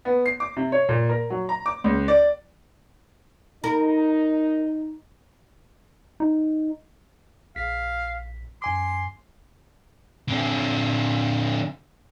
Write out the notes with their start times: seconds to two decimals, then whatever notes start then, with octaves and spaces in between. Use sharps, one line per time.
0.05 B3
0.26 C7
0.40 D6
0.57 C3
0.72 C#5
0.89 A#2
1.09 A#4
1.30 F#3
1.49 A#5
1.66 D6
1.84 C#2
2.08 D5
3.64 D#4 A#4
6.20 D#4
7.56 A#1 F5 B6
8.62 F#2 G#5 C6 D6
10.28 D3 C4